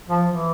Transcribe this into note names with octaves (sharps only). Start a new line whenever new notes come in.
F3
E3